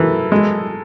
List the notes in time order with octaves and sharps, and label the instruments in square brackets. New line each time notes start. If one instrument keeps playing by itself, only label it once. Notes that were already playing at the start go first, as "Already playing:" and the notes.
Already playing: [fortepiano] E3 [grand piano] A4 A#4
[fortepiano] G#3